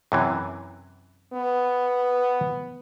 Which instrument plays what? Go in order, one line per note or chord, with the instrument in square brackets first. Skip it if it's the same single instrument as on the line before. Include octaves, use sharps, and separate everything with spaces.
[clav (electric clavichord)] F#2 C3 E3
[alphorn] B3